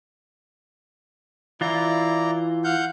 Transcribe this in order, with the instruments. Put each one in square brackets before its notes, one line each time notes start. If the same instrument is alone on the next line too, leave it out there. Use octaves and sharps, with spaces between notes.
[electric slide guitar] E3 F4 [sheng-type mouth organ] E4 D5 A#5
[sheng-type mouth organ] F5 F#5 G6